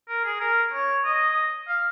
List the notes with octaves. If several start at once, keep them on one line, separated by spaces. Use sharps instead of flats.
A#4
G#4
A#4
C#5
D#5
F5